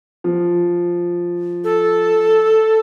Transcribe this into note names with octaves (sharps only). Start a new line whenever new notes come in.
F3
A4